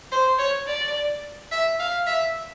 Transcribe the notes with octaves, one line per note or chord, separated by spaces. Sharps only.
C5
C#5
D5
E5
F5
E5